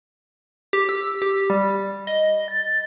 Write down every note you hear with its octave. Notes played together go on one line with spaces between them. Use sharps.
G4
E6
G4
G3
D#5
A6